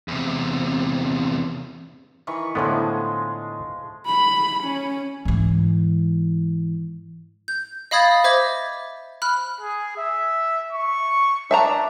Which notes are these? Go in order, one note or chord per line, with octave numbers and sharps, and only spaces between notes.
E2 C3
D#3 E3 C#6
A2 D3 F3 G#3 B3
B5
C#4
G#2 E3
G6
D#5 F5 B5 D#6 G#6 A6
C5 D#5 E5 D6 G#6
B5 F6 F#6
G#4
E5
C#6
D4 E5 A5 A#5